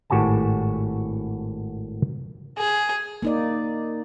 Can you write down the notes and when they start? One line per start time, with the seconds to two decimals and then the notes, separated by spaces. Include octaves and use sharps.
0.10 G#1 A2 F#4 G4 G#5 A5
2.58 G#4
3.22 A#3 D#4 D5